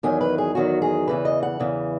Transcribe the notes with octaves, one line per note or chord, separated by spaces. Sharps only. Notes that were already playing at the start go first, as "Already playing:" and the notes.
E2 D#3 F#3 G#5
B4
G#4
E2 D#3 F#3 F#4
G#4
E2 C#3 E3 B4
D#5
F#5
E2 C#3 E3